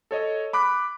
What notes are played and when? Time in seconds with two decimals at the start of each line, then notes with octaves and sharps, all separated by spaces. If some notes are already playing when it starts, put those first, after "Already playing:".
0.11 A4 C#5 D#5
0.53 B5 D6 F#6 B6